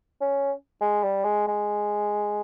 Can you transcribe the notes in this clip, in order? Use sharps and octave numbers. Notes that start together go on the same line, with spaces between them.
C#4
G#3
G3
G#3
G#3